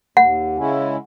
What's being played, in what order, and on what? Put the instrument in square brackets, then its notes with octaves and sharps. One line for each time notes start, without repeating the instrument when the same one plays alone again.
[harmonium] D#2 [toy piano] F#5
[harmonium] C#3 G#3 C#4 E4